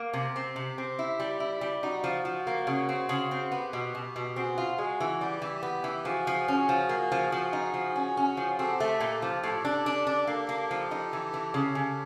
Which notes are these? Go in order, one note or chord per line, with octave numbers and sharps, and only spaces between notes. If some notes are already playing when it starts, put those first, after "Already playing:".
Already playing: A#3
C3 G4
C4
C3
C4
E4
G3
E4
G3
D#4 F#4
F3
F3
A#3
C#3
C4
C#3
C4
B3 G4
B2
B2
B2
C4 F#4 G#4
F4
G#3 F#4 G#4
E3
G3 G4
E3
B3
E3
F3 F#4 G#4
F3
C#4
F3
A#3
F3
F3
D#4
F3
C#4
C#4
F3
C4 G4 A4
A3
A#2
F3
A2 G4 A4
D4
D4
D4
A#3 G4 A4
A#3
F3
D#4
E3
E3
C#3
C#3